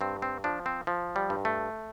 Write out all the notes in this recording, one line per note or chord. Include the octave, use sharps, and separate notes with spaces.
G2 C4
C4
F3 D4
C4
F3
G3
G2
A3